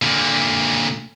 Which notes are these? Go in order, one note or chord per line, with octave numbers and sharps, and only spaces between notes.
A#2 D3